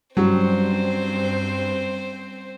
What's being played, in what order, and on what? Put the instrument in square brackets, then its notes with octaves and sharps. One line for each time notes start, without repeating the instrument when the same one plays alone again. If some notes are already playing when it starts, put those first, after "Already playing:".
[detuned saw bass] G2 [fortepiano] F#3 [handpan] G3 C#4 G4 [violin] C4 C5